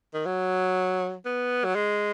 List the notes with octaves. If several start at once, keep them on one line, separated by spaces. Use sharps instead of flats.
D#3
F#3
B3
F#3
G#3